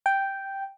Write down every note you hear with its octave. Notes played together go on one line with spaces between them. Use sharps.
G5